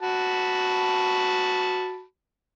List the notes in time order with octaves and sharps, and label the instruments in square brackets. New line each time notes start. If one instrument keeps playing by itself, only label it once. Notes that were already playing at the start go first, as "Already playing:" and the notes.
[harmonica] F#4 A5 B5